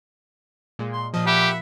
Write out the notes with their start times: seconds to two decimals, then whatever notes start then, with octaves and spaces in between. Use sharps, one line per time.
0.79 A#2 G#3
0.93 C6
1.14 A#2 F3 D#5
1.26 G4 E5 F#5 B5